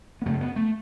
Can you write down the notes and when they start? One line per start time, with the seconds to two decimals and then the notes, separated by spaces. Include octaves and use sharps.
0.22 B3
0.26 F#2 C#3 A3
0.41 B3
0.56 A3